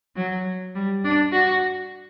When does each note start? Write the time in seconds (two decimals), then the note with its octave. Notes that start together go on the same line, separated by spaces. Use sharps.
0.16 F#3
0.75 G3
1.04 D4
1.32 F#4